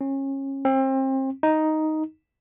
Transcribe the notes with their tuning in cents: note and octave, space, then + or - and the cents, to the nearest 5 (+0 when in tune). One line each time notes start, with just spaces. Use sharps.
C#4 -25
C4 +30
D#4 +5